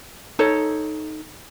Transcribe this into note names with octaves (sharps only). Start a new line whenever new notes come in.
D#4 A4 C#5